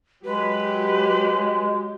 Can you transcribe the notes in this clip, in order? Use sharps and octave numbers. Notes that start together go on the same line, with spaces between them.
F#3 G#3 G4 B4